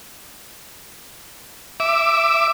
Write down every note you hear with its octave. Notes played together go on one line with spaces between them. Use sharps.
E5 D6